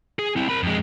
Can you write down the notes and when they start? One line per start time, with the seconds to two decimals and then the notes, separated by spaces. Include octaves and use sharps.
0.19 G#4
0.36 C4 E4
0.49 A#4 B5
0.63 F2 G#3